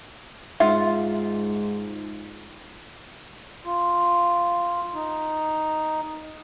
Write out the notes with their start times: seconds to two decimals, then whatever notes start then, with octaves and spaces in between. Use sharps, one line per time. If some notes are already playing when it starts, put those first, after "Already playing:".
0.60 G#2 F4 E5 F#5
3.65 F4
4.94 D#4